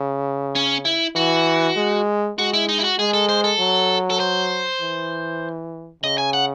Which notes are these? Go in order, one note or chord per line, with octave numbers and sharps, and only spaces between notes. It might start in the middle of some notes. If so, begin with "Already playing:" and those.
Already playing: C#3
C#4
E4
E3 F#4
G#3
G#3 F#4
E4
D#4
E4
F#4
G#3 G#4
A4
C5
A4
F#3
A4
C5
E3
C#3 D#5
G#5
F#5